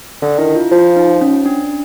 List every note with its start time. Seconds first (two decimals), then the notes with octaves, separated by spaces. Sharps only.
0.22 D3 D4
0.39 D#3 E4
0.56 F4
0.71 F3 F4
0.96 D#4
1.21 C#4
1.46 D4